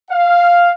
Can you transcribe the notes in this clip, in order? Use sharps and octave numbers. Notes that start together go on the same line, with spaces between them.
F5